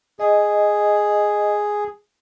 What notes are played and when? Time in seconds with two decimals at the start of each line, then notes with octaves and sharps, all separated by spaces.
0.20 G#4 D#5